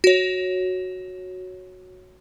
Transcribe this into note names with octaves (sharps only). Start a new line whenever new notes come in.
F#4 C#5